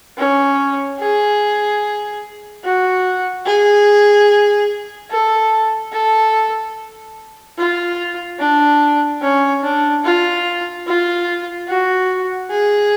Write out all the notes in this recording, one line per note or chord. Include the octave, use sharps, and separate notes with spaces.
C#4
G#4
F#4
G#4
A4
A4
F4
D4
C#4
D4
F4
F4
F#4
G#4